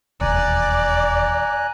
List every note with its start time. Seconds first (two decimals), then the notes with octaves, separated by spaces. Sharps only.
0.21 E1 D#2 D5 G#5 A#5 F#6